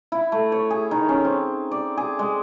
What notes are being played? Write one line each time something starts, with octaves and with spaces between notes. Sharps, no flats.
E4
A3
C#5
G#4
D#3
C#4
C4
D5
G#4
G#3